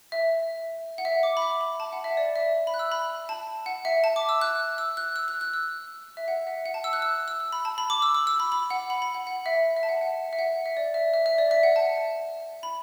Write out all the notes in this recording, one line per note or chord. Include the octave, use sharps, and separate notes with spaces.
E5
F#5
E5
D6
B5
D6
B5
A5
F#5
E5
D5
E5
B5
F#6
E6
B5
A5
F#5
E5
A5
D6
E6
F#6
E6
F#6
E6
F#6
F#6
E6
E5
F#5
E5
F#5
A5
E6
F#6
E6
E6
E6
B5
A5
B5
D6
E6
E6
E6
B5
B5
F#5
B5
B5
F#5
F#5
E5
E5
A5
F#5
F#5
E5
F#5
E5
D5
E5
E5
E5
D5
E5
F#5
A5
B5